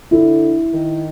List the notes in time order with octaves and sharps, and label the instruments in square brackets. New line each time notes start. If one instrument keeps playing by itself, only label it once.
[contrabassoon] D3 [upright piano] E4
[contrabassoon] D#3